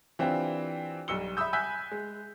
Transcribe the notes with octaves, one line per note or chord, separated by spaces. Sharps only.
E3 C4 D4 F4 G4
B1 G3 E6 C#7 G7
E5 B5 D#6 E6 G6
E5 G#5 E6 F#6 G6 B6
G#3